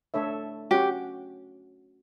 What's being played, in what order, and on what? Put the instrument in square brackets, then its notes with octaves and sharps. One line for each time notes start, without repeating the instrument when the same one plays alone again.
[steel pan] A3 D4 A4 C#5 E5
[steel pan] C#4 F#4 C#5 F#5 [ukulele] G4